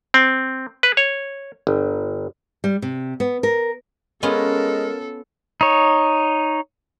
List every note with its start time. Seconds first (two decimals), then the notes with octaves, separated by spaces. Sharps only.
0.14 C4
0.83 B4
0.97 C#5
1.67 G1
2.64 G3
2.82 C3
3.20 B3
3.43 A#4
4.23 G#3 B3 C#4 F4 A4 A#4
5.61 D#4 C#5